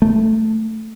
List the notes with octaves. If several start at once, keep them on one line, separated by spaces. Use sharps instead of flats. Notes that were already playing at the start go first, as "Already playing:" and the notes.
A3